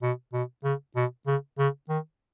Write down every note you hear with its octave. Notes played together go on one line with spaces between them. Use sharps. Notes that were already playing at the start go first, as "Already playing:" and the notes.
B2
B2
C#3
B2
C#3
C#3
D#3